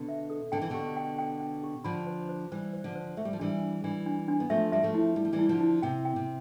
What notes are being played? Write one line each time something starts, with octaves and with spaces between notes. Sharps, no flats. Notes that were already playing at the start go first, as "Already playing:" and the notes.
Already playing: B2 D3
E5
A4
D3 G5
E3
B2 D3 G4
G5
G5
G5
G4
D3 F3 B5
C5
C5
E3 G3 C5
C5
D3 F3
C5
A3 E5
G3
F3
E3 G3 D4
D4
E3 G3 D4
D4
D4
B3
F3 A3 E5
G3 E5
F3 A3
E4
G3 E4
F3
E3 G3
E4
D3 F3
E4
C3 G5
G5
C3